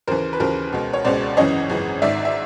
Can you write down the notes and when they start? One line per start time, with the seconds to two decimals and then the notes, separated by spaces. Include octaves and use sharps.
0.07 D#2 C#3 E3 A#4 C5
0.33 B4
0.40 D#2 C#3 E3 A#4 C5
0.73 C#2 B2
0.93 C#5
1.04 C#2 B2 C5 D5
1.37 G#1 F#2 C#3 E3 C#5 D#5
1.70 G#1 F#2 C#3 E3
2.02 G#1 G#2 D#3 D5 E5
2.25 E5